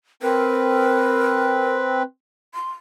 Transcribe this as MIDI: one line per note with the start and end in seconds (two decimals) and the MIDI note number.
0.23 2.03 60
0.23 1.75 70
0.23 2.03 71
2.54 2.70 84